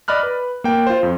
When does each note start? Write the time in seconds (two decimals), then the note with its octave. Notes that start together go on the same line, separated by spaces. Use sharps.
0.08 D5 D#5 B5 F6 F#6
0.23 B4
0.64 A#3 G5
0.87 F4 C5
1.03 F2